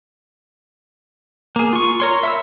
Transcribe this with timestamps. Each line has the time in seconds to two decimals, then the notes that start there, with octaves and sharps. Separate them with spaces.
1.56 A#3 G#4
1.73 F4 C#6
2.00 A#4 C#5 C6
2.23 E5 B5 E6